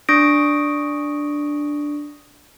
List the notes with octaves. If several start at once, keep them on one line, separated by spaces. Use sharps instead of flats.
D4 C#6 D#6 A#6 D7